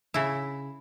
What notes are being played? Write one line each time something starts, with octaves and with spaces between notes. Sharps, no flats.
C#3 E4